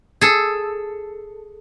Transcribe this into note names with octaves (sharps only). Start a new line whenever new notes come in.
G#4 A4